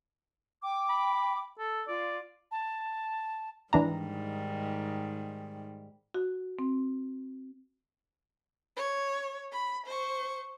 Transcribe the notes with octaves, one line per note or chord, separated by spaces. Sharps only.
G5 D6
B5
A4
F4 D5
A5
G#2 D#3 E3 G3 D4 A#5
F#4
C4
C#5
B5
C5 C#6